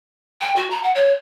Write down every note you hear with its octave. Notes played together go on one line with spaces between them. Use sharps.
G5
F#4
A#5
F#5
C#5